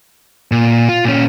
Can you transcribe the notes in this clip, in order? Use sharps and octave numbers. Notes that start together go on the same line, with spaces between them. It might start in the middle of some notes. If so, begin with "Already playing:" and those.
A#2
F4
A#2 C#4